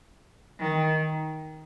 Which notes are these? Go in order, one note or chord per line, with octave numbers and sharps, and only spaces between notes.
D#3